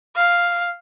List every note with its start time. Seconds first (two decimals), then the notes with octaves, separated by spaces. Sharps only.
0.16 F5